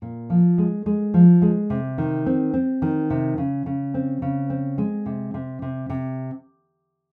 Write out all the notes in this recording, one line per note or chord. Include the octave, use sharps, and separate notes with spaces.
A#2
F3
G#3
G#3
F3
G#3
C3
D#3
C4
C4
D#3
C3
C#3
C#3
C4
C#3
C4
G#3
C3
C3
C3
C3